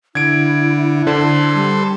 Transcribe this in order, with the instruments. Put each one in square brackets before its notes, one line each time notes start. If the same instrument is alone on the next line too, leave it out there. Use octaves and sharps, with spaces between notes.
[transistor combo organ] D3 [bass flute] E4 [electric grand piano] G#6 D7
[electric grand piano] D3 [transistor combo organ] A4 C5
[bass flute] G3